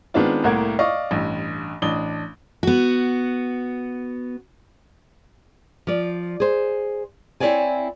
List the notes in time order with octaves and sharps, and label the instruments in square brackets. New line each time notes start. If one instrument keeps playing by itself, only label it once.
[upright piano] D#3 G#3 B3 C4 D4 F4
C2 A2 A#3 A#4 F#5 G#6
D5 D#5 F5 C#6
A1 G2
A1 D4 D#6 G7
[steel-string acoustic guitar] B3 F#4
[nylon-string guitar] F3 D5
G#4 C5
C4 E4 G#4 C#5 D5 G#5